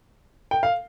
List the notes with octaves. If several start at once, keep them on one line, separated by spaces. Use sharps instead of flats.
G5
F5